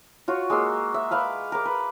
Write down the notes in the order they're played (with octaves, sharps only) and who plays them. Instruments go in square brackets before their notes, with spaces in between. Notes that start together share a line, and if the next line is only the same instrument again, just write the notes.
[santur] F4 F#4 C#5
G#3 A#3 C6 E6
E5
B4 F5 B5 D6
A#4 D6
B4